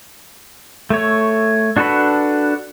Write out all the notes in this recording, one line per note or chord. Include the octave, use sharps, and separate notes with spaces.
A3 C#5
D4 F#4 A4 B4 B5